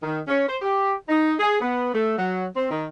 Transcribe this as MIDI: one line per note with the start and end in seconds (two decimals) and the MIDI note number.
0.03 0.19 51
0.28 0.48 61
0.49 0.57 72
0.61 0.93 67
1.09 1.32 63
1.40 1.59 68
1.61 1.93 59
1.95 2.13 57
2.18 2.46 54
2.57 2.69 60
2.71 2.86 51